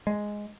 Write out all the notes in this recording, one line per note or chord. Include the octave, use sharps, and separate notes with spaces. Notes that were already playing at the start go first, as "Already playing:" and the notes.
G#3